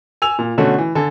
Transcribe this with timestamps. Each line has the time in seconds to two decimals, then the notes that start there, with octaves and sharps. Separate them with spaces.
0.22 G#5 E6 F7
0.39 A#2
0.58 B2 D3 A3 C#4 F#4
0.78 E3
0.95 D3 A4 G#5